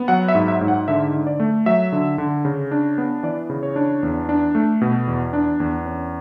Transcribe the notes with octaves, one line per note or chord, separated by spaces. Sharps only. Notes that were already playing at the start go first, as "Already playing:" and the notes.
Already playing: B3
F#3 F#5
E5
G#2
E5
G#2
F#5
D3 E5
D3
D5
A3
F#3 E5
D3
D3
C#3
D4
B3
E3 D5
C#3
C#5
D4
E2
D4
A3
B2
E2
D4
E2
C#4